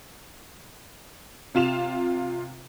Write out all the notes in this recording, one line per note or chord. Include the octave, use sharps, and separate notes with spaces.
C3 F4 E7 F7